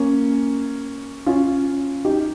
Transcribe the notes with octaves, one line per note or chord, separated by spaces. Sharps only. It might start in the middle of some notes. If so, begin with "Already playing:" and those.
Already playing: A#3 C#4
C#4 F4
D#4 G4